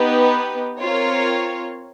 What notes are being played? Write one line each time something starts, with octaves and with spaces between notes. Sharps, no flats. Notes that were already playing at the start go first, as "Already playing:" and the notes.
Already playing: B3 D#4 G4 B4
C4 F4 A#4 C#5